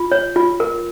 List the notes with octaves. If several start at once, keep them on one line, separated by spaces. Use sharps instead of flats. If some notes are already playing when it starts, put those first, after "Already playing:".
Already playing: F4
C#5
F4
A#4